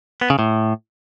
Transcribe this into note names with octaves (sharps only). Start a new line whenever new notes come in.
B3
C#3
A2